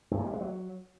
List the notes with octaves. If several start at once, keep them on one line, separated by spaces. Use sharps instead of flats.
G2
A#2
G3
G#3
F#3